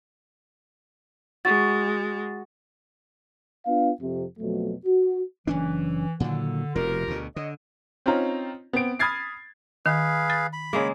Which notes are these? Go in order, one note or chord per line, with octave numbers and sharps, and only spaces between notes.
G#3 F#4 A6
B3 D4 F4 F5
F2 C3
F2 B2 F#3 A3
F#4
F#1 E3 C#4 D4
A#2 D3 D#3 F#3
F1 B2 F4 G4 A#4
D2 B2
D3 C#5 D#5
C4 C#4 D#4 F4 A#5
B3 C4 D7
B5 D#6 F6 G#6 A6 C7
D#3 G#4 B4 F5
A6
B5
C#3 G#3 A#3